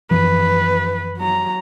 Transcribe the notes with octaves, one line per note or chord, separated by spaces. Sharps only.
F#2 E3 F3 B4
F#3 A#5